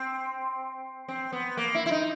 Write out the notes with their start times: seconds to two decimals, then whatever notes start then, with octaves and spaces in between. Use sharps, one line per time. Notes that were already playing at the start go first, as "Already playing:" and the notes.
Already playing: C4
1.08 C4
1.33 B3
1.57 A#3
1.75 E4
1.86 E4
1.91 D#4